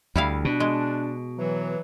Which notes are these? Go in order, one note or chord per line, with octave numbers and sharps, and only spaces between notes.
D2 G3 E4 F5
B2 D4
G#3
E3 F#3